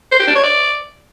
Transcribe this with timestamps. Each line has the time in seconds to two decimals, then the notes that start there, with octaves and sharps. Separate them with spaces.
0.12 C5
0.20 G4
0.27 D4
0.35 C#5
0.43 D5